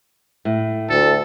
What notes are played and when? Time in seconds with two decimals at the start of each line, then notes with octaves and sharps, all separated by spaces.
0.45 A2
0.90 D2 A4